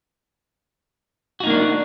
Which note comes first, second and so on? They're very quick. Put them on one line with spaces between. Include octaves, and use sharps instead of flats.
F#4 D#4 A#3 D4